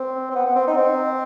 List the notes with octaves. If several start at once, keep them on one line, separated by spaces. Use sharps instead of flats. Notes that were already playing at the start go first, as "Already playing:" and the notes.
Already playing: C4
C4
B3
B3
C4
D#4
C4